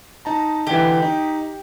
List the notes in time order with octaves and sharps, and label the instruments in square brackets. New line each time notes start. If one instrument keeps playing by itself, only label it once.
[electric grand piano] D#4 A5 A#5
[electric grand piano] D3 E3 [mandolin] G4
[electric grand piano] D#4